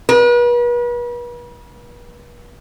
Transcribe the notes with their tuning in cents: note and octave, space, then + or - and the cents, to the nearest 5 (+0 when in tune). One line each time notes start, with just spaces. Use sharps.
B4 -40